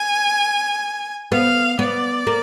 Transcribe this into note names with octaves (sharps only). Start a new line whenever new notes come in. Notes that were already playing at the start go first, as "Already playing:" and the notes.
Already playing: G#5
B3 F5
B3 D5
A#3